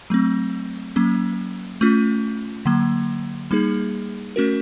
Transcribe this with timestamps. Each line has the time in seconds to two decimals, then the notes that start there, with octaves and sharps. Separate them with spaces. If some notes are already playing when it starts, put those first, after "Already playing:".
0.10 F#3 A3 C4
0.96 F#3 A#3 C#4
1.81 A3 C#4 F4
2.66 D3 F#3 A#3
3.51 G3 A#3 D#4 G#4
4.36 A3 C#4 F#4 A#4